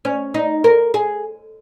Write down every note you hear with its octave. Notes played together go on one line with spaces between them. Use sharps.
C#4
D#4
A#4
G#4